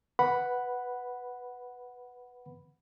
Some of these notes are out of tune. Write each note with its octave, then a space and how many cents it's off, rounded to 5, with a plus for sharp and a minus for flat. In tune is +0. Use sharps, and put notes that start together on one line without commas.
B4 +0 F#5 +0 B5 +0